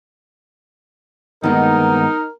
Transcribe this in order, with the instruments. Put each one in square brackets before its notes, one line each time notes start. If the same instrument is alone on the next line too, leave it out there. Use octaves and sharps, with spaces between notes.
[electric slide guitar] G2 D#3 G#3 [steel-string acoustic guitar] A#3 B3 [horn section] D#4 [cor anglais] A#4